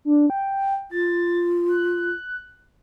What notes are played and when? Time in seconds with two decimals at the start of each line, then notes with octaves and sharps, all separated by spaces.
0.05 D4
0.30 G5
0.91 F4 A6
1.69 F#6